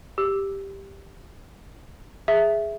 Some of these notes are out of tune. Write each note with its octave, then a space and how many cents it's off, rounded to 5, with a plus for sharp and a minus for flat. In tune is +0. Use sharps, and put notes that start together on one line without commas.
G4 +0 E6 +0
G#4 +0 E5 +0